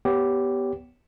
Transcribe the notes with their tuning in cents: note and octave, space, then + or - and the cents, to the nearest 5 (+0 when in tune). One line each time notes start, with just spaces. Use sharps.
B3 +0 G4 -5 C#5 +20